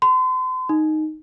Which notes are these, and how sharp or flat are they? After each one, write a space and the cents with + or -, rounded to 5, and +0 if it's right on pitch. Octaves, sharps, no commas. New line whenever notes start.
C6 -40
D#4 -5